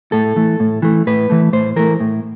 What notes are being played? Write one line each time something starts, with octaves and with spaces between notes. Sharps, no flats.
A2 A4
E3 A3
A2
E3 A3
A2 B4
E3 A3
A2 C5
E3 A3 A#4
A2